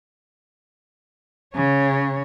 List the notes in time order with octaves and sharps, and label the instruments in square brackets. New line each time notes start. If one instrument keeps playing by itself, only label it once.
[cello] C#3 C#5